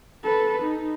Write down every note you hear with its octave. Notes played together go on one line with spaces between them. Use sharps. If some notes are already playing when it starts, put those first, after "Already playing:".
A4 B4
D#4